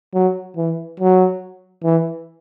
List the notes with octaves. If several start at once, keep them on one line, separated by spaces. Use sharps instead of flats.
F#3
E3
F#3
E3